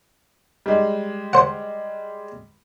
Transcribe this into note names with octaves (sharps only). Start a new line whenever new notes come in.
G3 G#3
C5 F#5